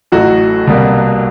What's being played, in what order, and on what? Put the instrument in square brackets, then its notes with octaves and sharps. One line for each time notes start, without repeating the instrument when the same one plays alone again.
[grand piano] A1 A2 F#3 A3 F#4
C2 B2 G3 A#3